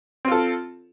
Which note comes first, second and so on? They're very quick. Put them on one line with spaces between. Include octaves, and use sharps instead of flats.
C4 F4 A4